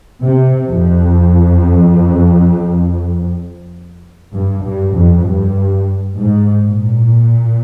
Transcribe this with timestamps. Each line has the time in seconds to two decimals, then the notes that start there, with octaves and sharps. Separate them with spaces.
0.21 C3
0.67 F2
4.34 G2
4.64 G2
4.95 F2
5.25 G2
6.17 G#2
6.62 A#2